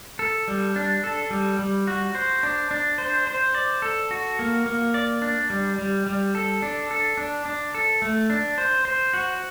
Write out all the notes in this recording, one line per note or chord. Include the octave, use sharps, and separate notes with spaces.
A4
G3
D4
A4
G3
G3
F#4
C5
D4
D4
C5
C5
D5
A4
F#4
A#3
A#3
D5
D4
G3
G3
G3
A4
D4
A4
D4
D4
A4
A3
D4
C5
C5
F#4